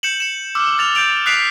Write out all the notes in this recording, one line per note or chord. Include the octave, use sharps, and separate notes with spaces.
G6 C#7 E7 F#7
C#7 E7
D6 E6 F6
F6 A6 F7
G6 A6 D7 F7
D#6 F#6 B6 C7 D7 F7